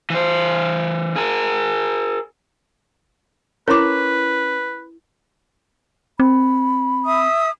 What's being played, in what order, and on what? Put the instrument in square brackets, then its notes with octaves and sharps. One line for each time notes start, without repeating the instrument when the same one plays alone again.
[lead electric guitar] E3 C5
G#4 A#4
[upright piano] C#4 E7 [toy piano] E4 A#5 C6 [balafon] A#4 D6 [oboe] B4
[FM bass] C4 [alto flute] B5
[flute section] E5 D#6